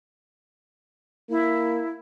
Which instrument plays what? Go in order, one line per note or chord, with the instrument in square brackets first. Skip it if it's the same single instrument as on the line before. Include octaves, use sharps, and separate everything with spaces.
[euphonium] A#3 [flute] E4